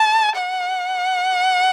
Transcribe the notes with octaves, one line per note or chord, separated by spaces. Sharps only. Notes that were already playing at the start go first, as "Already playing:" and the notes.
Already playing: A5
F#5